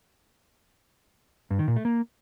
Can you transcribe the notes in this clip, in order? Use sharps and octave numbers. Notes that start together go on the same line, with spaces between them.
G2
D#3
A#2
A3
A#3